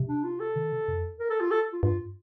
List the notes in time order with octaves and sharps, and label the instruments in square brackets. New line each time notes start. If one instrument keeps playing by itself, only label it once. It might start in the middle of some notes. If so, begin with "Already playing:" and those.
Already playing: [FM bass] C3
[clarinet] D4
F4
A4
[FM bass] D#3
C3
F2
[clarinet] A#4
A4
F4
A4
F4
[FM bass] G2 [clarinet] F4